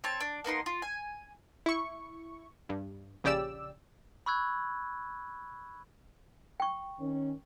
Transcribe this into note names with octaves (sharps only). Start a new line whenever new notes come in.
C4 C#5 A5
D4
A#3 B3 D#4 C6
F4
G#5
E4 C#6
G2
A#1 C#3 G4 D5 E6
B5 C#6 E6 F#6 G#6
G5 C#6
D#3 C#4